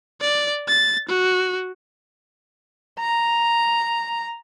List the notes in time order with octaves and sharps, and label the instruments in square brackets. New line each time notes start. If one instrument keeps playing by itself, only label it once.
[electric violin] D5
A6
F#4
[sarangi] A#5